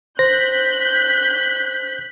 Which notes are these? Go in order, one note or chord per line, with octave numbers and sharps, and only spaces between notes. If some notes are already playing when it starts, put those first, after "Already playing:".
C5 F#6 G6 A#6 B6